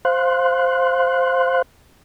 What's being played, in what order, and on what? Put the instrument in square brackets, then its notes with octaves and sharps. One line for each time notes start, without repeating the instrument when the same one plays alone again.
[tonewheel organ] C5 F5 C6 F#6